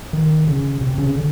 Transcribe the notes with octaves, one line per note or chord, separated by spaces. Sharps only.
D#3
C#3
C3
C#3
D3